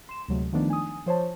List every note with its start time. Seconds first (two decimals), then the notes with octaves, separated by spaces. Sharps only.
0.09 C6 E7
0.28 D2 C3 F#3 G#3 A3
0.53 D#3 F3 A3 B3 D4 D#4
0.70 G#5 D#6
1.06 F3 C5 C#5 A5